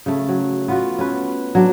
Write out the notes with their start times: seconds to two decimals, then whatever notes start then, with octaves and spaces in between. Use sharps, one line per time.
0.06 C#3 A3
0.28 F#3
0.68 B3 F4 F#4
0.99 C#4 B4
1.55 F#3 D4